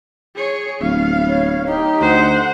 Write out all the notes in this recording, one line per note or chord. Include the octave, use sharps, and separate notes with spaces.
G#4 C#5
D1 B3 F5
C#5
D#4 G4
D2 C5 F#5